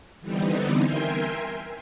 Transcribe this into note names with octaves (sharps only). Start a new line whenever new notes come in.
D3 E3 G3 B3 C4 D#4
A#4 E5 G5 G#5 C6